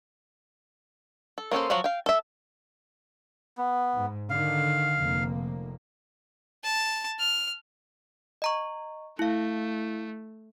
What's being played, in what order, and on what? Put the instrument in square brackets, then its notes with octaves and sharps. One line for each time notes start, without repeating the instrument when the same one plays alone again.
[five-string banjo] A4
A#3 C#4 A4 C5
F3 F#3 F4 F#4
F5 G5
A4 E5
[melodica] B3
[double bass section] G#2
[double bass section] D3 D#3 [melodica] F5
[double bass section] F1 A#3
[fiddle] A5
F6
[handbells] D#5 A#5 C#6
[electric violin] A3 [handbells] E4 F5